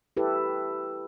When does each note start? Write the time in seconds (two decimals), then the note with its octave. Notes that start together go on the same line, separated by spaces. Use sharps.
0.17 E4 G4 A4 B4